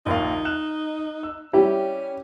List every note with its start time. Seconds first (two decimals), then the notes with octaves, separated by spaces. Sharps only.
0.06 A#1 D#2 D#4 F5
0.45 F6 F#6 E7
1.23 E6
1.53 G3 C#4 E4 G4